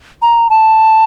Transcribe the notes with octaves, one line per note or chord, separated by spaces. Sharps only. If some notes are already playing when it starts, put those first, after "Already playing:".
A#5
A5